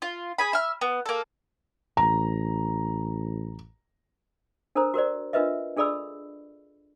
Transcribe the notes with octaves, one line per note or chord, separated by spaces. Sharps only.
F4
G#4 G#5 B5
E5 F6
B3
A#3 A4
A1 A#5
D4 A4 A#4 C5 A#5
F#4 A#4 C5 D5
D4 F4 A#4 B4 D#5 E5
D4 G#4 A4 D5 B5 E6